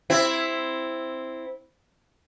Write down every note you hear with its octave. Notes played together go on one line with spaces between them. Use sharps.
C4 E4